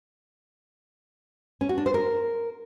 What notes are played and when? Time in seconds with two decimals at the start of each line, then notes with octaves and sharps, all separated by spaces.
1.61 C#4
1.69 F#4
1.78 D4
1.86 C5
1.94 A#4